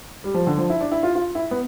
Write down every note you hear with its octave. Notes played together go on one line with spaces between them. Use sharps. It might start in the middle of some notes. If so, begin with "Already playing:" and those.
G3
F3
D3
F3
E4
D4
E4
F4
F4
E4
B3